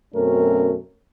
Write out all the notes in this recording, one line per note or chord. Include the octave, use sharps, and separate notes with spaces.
F#2 B2 A3 C4 C#4 A#4